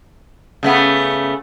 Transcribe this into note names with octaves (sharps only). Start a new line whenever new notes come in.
C#3 A3 B3